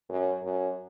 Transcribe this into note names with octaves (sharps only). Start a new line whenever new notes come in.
F#2
F#2